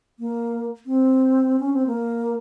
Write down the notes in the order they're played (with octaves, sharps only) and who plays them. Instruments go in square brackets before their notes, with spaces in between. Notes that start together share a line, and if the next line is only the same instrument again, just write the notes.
[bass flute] A#3
C4
C#4
C4
A#3